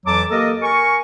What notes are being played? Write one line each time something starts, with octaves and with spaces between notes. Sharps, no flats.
F2 E3 F#3 A5 D6
A#3 G4 A4 A#4 D#5
A#4 G#5 C#6